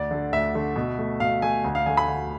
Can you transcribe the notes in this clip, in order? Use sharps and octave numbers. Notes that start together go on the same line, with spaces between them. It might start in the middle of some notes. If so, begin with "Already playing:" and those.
Already playing: D2 D5
D3 A3
D2 E5
D3 A3
B2
A3
B2 F5
A3 G#5
D2
F5
D3 A3 G#5
B5
D2